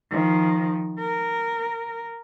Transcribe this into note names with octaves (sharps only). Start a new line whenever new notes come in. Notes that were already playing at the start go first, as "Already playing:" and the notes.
D#3 F3
A#4